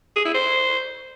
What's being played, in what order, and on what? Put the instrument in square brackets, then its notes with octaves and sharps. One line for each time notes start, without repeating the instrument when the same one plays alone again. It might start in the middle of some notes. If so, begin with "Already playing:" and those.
[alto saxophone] G#4
E4
C5